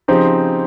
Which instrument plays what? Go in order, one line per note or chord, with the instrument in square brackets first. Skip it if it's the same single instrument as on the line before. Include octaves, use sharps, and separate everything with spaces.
[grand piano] C#3 F3 C4 D#4 G4